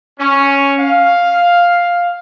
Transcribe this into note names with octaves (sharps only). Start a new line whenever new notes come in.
C#4
F5